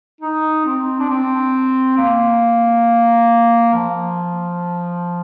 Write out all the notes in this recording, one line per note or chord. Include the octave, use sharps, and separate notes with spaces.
D#4
C4
D4
C4
A#3
F3